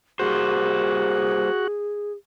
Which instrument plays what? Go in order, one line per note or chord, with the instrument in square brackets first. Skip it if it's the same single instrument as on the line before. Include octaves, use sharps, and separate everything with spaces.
[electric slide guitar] G3 A#3 C5 [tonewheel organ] F#4 [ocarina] G#4